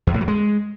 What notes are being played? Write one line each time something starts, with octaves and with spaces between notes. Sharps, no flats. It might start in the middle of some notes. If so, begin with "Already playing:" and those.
E2
A2
F#3
G#3